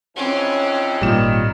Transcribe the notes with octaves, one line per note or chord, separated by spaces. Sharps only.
G#2 E3 F3 C4 C#4
G#1 A#2 D#3 G3 E7